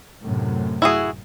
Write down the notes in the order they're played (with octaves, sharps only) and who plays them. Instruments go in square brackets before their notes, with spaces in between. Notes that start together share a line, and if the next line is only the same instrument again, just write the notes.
[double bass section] F#2 A2 C3
[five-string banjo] E4 F#4 G#4